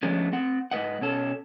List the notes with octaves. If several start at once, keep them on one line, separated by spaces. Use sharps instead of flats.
D3 F3 G#3 A3 B3 C#4
C4 F#5
G#2 E3 B4 D#5 F#5
B2 C#4 A4